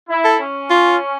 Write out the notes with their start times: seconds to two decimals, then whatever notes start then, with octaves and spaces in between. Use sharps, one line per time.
0.10 E4
0.24 A4
0.39 C#4
0.70 F4